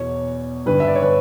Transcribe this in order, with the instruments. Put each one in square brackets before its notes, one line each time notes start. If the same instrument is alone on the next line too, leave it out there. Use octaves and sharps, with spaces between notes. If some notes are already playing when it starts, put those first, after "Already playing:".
Already playing: [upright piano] E2 B2 C#5
G2 D3 B4
E5
D5
C#5
B4